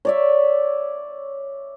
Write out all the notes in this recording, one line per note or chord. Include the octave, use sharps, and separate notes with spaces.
C#5 D5 E5